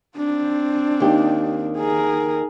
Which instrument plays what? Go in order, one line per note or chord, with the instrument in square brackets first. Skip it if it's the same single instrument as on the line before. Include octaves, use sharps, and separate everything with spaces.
[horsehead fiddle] C4 D4
[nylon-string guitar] D#2 D#3 G4
[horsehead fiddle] G#4 A#4